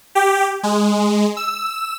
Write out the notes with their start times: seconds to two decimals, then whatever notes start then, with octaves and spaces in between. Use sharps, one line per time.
0.15 G4
0.63 G#3
1.37 E6